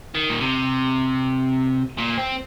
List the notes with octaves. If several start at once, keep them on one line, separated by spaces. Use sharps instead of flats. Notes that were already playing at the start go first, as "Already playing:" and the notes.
D#3
A#2
C3
A#2
C4